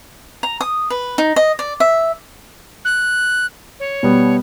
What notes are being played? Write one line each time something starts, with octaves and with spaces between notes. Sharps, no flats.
A#5
D#6
B4
D#4
D#5
D5
E5
F#6
C#5
B2 G3 B3